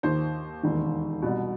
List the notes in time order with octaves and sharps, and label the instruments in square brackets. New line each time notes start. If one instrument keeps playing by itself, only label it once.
[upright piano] D#2 D#3 C5
E1 D#2 D#3
C2 B2